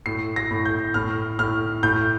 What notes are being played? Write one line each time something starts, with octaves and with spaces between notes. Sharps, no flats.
A2 C7
A#6
A2
G6
A2 F6
A2 F6
A2 G6